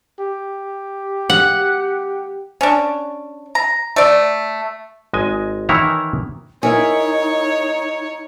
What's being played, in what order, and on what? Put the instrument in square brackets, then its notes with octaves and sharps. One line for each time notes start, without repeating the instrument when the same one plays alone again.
[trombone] G4
[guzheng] F#5
[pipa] C#4 D4
A#5
A3 D5
[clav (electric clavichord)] G#1 G#3 D#5 G#5
D#3 E3 E4 C#5 E5 A#5
[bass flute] D#4 [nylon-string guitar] E4 A#4 E5 [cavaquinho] G#4 [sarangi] C#5